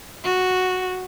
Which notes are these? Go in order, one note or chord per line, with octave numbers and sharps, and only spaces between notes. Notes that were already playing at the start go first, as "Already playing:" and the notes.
F#4